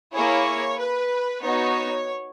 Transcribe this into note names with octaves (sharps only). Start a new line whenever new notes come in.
A#3 E4 G#4 C#5
B4
B3 D#4 F#4 C#5